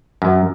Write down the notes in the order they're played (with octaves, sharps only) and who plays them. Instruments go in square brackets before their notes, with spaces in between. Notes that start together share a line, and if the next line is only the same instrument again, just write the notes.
[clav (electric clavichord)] F#2